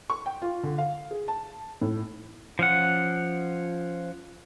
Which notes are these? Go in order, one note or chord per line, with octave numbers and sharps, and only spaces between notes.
C#6
G5
F4
D3
F5
G#4
A5
A2
F3 C#4 F#5